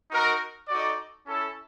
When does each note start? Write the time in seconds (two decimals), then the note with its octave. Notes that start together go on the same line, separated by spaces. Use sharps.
0.11 D#4 F#4 A#4
0.68 D#4 F#4 A4 D5
1.26 C#4 E4 A4